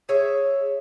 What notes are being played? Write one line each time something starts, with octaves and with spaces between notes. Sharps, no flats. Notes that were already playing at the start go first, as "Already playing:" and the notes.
G#4 C#5 E5